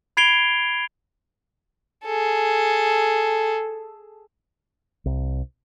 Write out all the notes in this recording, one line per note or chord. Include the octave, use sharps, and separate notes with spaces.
B5 G#6 C7 D7 F7 G7
G#4 A4
C2